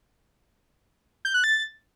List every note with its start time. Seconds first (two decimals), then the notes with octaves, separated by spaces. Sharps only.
1.25 G6
1.34 F#6
1.44 A6